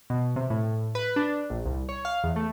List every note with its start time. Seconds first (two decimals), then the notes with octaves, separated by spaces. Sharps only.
0.10 B2
0.36 C3
0.50 A2
0.95 B4
1.16 D4
1.50 A#1
1.66 C2
1.89 C#5
2.05 F5
2.24 E2
2.36 A3